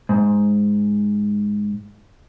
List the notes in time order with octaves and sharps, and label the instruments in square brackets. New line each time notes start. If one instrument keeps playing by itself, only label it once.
[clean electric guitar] G#2